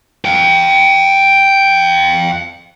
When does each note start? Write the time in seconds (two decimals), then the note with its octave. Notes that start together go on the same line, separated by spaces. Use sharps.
0.25 F5 G5